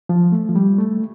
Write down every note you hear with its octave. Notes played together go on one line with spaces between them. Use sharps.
F3
A3
F3
G3
A3